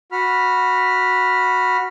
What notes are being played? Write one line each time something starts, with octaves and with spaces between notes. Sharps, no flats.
F#4 B5 F6